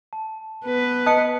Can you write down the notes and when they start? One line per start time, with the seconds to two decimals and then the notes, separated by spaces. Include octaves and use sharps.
0.13 A5
0.66 B3 B4
1.06 D#5 A5 D#6 F#6 C#7